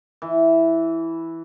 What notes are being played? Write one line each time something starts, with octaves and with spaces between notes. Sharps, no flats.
E3